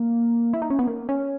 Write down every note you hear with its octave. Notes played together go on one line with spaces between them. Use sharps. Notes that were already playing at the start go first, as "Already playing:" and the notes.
Already playing: A#3
E4
D#4
C#4
B3
A#3
C#4